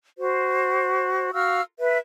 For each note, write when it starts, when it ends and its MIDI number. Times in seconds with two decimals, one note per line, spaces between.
0.17 1.32 66
0.17 1.32 72
1.33 1.61 66
1.33 1.61 77
1.33 1.61 88
1.33 1.61 89
1.79 1.98 71
1.79 1.98 76